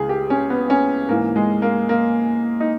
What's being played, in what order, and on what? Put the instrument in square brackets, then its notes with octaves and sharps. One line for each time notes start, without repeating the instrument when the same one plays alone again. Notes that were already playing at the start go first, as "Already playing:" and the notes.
Already playing: [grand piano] C#2 C#3 E3 G#4
G4
C#4
B3
C#4
G#2 E3 A#3
G#3
A#3
A#3
D#4